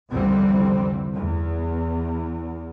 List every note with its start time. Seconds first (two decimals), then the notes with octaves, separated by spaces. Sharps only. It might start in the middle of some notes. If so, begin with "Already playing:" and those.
0.11 C2 F2 D3 E3 G3 C4
1.15 E2